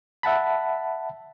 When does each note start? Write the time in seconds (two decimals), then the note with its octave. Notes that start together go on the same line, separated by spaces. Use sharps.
0.23 E5 F#5 A5 B5